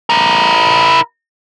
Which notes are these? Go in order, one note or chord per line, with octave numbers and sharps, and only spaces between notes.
E4 A#4